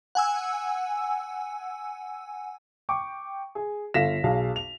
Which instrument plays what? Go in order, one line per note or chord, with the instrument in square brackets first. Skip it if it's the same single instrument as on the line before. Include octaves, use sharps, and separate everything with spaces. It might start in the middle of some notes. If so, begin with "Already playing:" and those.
[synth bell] F#5 G#5 E6
[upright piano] G5 C#6 D6
G#4
G1 A4 F5 A#6 B6 E7
B1 G#4 F5
F7